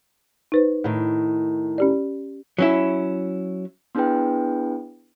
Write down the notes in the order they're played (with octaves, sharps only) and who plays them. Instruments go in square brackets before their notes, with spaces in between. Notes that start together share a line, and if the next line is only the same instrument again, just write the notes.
[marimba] D#4 B4 C5
[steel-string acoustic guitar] A2 D#3
[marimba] C#4 G4 D5
[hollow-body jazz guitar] F#3 C#4 E4
[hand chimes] B3 D4 E4 G#4 B4 G5